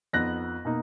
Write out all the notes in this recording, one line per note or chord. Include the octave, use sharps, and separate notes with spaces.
F2 F3 B3 D#4 F#6 A#6
B2 A#3 D#4